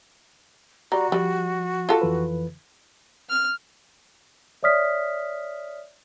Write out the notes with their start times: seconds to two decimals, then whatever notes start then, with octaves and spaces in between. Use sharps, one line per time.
0.92 G3 F#4 D5 A#5
1.12 F3 G3
1.89 F4 A4
2.02 F2 E3 B4
3.30 F6
4.63 C#5 D5 E5 D#6 F6 B6